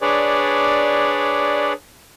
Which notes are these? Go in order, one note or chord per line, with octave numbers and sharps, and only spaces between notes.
D4 G#4 B4 C#5 D5